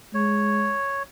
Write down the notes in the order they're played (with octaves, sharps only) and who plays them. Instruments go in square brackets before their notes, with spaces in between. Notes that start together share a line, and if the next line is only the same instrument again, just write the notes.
[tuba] G#3 [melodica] C#5